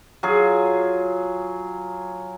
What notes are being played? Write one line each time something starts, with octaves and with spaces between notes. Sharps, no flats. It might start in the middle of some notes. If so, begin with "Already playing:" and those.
F#3 F4 G#4